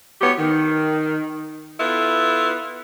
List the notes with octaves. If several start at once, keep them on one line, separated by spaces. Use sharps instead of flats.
A2 B3 F#4 G4 C#5
D#3
B3 E4 F4 A4